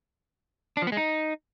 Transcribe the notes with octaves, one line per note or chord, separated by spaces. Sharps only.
D4
F3
B3
G#3
D#4